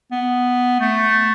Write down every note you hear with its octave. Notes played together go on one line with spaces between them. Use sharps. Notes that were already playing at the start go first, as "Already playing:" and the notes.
B3
A3